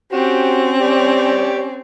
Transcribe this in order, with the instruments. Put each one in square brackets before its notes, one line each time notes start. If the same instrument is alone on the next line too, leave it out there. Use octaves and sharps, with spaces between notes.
[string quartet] C4 C#4 [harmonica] F#4 G4
[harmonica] G4 C#5 D5